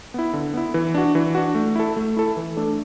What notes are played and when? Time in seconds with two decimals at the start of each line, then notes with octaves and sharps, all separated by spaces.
0.14 B3 E4
0.33 D3
0.54 B3 E4
0.74 E3
0.94 D4 F#4
1.15 E3
1.35 D4 F#4
1.55 A3
1.75 E4 A4
1.96 A3
2.17 E4 A4
2.37 E3
2.56 A3 D4 A4